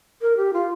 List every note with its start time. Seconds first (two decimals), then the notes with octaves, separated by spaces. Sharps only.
0.22 A#4
0.37 G4
0.53 F4